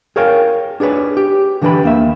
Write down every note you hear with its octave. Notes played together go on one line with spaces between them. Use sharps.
G#4 A#4 C#5 F5 G5
D4 G#4 A4 B4 C#5
G4
D3 E3 D4 B4 G5 B5
D#2 A#3 E5